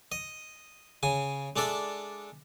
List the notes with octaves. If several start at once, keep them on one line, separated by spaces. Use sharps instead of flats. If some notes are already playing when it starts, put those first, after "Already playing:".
D#5
C#3 G#5
G#3 D4 A4 D5 E5